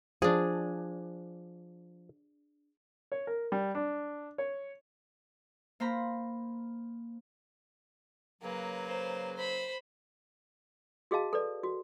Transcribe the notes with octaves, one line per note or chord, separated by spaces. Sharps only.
F3 D4 G#4
C#5
A#4
G3
D4
C#5
A#3 C5 A#5 B5
C#3 F#3 A#3 B4
C5
C5 B5
F#4 G#4 D#5 F5 A5
A4 B4 D5
F#4